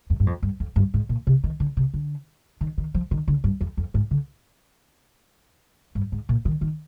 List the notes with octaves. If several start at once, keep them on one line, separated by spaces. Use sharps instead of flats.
F2
G2
F2
G2
F2
G2
G#2
A#2
C3
D#3
D3
C3
D3
D#3
D#3
F3
D#3
D3
G2
F2
F2
G#2
D3
G2
G#2
A#2
D#3
D#3